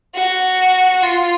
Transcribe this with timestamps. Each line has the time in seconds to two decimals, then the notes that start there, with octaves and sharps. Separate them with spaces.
0.15 F#4
1.02 F4